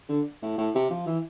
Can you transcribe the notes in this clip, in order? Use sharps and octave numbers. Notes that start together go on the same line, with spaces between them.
D3
A2
A2
C3
F3
E3